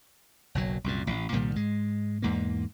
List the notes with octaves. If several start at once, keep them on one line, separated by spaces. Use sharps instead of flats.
F#1 B1 F#3
C2 F#2 A#2
A1
C2 A#2 D#3 G3
G#2 G#3
E2 G#2 A#3